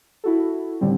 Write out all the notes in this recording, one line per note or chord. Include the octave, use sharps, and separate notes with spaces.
E4 F#4 A4
A2 D3 D#3 G3 C4